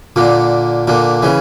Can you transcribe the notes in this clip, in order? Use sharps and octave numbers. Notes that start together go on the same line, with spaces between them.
A#2 D3
A#2 D3
C#3 E3